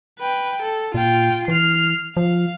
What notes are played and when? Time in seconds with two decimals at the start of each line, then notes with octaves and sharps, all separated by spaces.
0.19 B4 G5
0.62 A4
0.94 A#2 F4 G5
1.48 E3 F6 C7
2.17 F3 F5